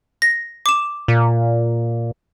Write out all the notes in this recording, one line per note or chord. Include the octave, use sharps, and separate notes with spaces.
A#6
D6 E7
A#2